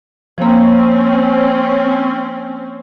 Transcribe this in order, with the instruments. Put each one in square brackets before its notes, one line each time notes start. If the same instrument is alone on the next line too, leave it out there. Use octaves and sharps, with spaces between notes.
[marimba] F3 A#3 [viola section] C4 C#4